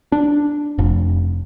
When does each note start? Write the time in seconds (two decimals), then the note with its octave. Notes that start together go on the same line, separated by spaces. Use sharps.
0.12 D4
0.78 F1